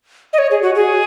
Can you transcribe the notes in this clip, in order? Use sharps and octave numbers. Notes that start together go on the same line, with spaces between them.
D#5
C#5
G#4
F#4
G#4